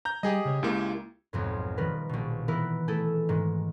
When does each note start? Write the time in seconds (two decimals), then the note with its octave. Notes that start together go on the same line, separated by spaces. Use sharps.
0.05 A#5 G6
0.23 G3 G4 G#4 D#5
0.45 C#3 C#5
0.63 C#2 G#3 A#3 E4 G4
1.33 B1 F2 G#2
1.77 D#3 F3 G3 A#4 B4
2.09 A#1 B2
2.48 E3 B3 E4 A#4 B4
2.88 A3 E4 G#4 A4
3.29 G#2 D#3 G#3